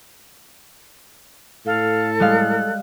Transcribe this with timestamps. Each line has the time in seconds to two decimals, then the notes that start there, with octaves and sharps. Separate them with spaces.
1.66 A2 A4 F5
2.20 G3 G#3 F5 F#6